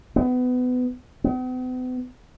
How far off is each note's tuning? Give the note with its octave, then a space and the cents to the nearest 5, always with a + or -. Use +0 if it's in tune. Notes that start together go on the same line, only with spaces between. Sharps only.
B3 +25
B3 +45